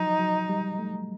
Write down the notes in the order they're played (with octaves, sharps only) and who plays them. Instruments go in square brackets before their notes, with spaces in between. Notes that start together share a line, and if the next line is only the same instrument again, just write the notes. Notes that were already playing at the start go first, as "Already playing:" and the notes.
Already playing: [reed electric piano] F3 F#3 [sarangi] D#4
[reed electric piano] F#3
G3
A3